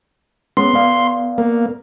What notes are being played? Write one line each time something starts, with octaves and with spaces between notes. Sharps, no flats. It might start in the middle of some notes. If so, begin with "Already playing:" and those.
G#3 B3 C#4 C6
B3 D5 F5
A#3